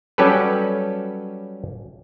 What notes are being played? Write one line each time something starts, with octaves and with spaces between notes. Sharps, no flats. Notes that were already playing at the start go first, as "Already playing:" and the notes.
F#3 G3 C#4 G4 A4 B4